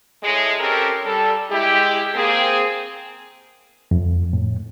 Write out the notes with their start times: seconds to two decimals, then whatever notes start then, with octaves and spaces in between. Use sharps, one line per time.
0.23 A2 G#3
0.60 C4 C#4 G4 A4 A#4
1.05 G3 A4
1.51 G#3 E4 G4
2.15 A#3 C4 G#4
3.91 F2
4.33 A2